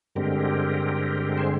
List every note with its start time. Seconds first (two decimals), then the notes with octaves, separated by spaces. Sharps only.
0.15 G2 D3 G#3 C4 G4 A#4
1.37 G#4 C5